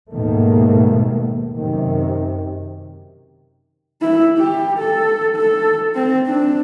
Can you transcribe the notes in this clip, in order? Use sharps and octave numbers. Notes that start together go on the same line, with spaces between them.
D#2 G#2 B2 D#3 A3 A#3
F#2 C3 D#3
E4
G4
A4
A4
C4
D4